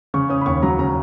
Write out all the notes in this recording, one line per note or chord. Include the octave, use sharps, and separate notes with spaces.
C#3 C#6
C#4 D#6
B5
D#2 C#6
F#3 A#5
C#3 A#5